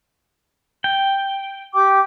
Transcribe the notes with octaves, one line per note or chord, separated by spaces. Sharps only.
G5
G4 G5 D6